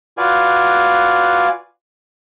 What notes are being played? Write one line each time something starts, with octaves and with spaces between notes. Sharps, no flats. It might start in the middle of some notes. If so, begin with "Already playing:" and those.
F4 F#4 B4 D5 F5 G#5